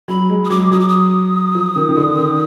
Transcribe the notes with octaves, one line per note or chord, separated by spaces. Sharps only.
F#3 B5
G#3
D#6
F#3 D6
F#3 D#6
D6
D#6
F3
D#3
D#3
D3
D#3